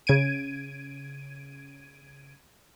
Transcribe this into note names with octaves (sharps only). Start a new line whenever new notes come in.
C#3 G#6 D7 D#7